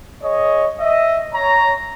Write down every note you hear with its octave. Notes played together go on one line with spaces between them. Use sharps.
G#4 C#5 D#5
D#5 E5
C#5 A#5